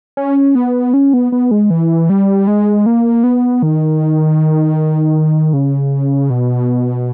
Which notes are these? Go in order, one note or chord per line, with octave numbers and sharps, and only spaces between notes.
C#4
B3
C#4
B3
B3
G#3
E3
G3
G#3
A#3
B3
D#3
C#3
B2